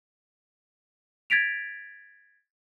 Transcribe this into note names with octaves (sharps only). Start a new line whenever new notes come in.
G#6 A6 B6 D7 F7